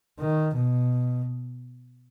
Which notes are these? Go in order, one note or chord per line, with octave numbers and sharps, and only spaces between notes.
D#3
B2